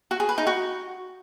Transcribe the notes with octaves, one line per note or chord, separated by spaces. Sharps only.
F#4
G#4
B4
D#4
F#4